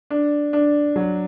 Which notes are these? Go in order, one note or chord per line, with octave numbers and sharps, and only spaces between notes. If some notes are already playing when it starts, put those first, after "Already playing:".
D4
D4
F#3